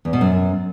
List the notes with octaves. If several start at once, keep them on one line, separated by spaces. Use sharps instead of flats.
E2
B2
F#2